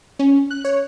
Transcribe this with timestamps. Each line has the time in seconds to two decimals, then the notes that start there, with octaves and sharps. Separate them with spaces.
0.19 C#4
0.51 F#6
0.65 C#5